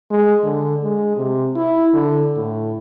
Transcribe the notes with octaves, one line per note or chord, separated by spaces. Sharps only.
G#3
D3
G#3
C3
E4
D3
A2